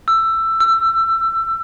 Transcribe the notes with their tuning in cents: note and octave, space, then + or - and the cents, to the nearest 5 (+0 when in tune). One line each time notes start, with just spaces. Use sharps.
E6 +15
E6 +25